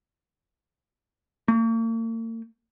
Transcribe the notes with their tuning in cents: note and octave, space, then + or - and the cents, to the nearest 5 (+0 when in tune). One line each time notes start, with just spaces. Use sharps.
A#3 -45